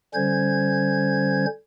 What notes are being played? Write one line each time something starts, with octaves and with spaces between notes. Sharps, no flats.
D3 G3 C#4 C5 G#6